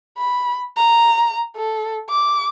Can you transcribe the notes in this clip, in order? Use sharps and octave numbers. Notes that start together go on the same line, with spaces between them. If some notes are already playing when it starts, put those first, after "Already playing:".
B5
A#5
A4
D6